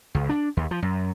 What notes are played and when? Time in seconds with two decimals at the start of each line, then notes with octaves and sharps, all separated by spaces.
0.15 C#2
0.29 D4
0.57 D#2
0.71 F3
0.82 F#2